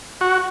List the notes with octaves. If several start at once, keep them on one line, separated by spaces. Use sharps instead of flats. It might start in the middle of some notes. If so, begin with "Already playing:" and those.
F#4